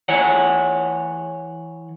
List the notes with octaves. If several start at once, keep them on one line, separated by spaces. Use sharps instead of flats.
E3 C#5 F#5